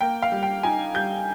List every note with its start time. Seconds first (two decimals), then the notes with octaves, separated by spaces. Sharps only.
0.01 A#3 G5
0.22 F5
0.32 G3
0.43 G5
0.63 D#4 G#5
0.94 G3 G6